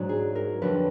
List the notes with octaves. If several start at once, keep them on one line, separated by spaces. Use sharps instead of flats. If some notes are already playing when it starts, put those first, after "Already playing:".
Already playing: G#2 F#3 D4
G#4
A#4
F2 D3 F#3 D4 B4